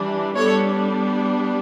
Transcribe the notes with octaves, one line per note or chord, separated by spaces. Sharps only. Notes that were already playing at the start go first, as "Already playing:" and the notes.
Already playing: E3 G3 D4
G3 B3 D4 A4 C#5